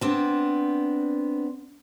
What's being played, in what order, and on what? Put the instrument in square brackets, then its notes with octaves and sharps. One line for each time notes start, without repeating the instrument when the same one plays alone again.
[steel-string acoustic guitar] B3 C4 D4